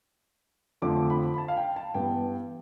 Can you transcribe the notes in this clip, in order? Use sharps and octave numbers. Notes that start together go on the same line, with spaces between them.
F2 D3 F3 A3 D6
B5
B5
A5
F5
G5
A5
G2 E3 B3 G5